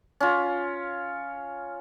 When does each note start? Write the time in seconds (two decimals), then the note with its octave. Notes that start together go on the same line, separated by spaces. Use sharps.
0.20 C#4 F4